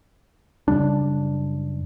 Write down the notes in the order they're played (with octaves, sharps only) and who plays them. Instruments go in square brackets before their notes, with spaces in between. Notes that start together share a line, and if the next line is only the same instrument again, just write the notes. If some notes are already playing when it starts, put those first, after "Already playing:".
[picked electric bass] F#2 C#3 G3 D4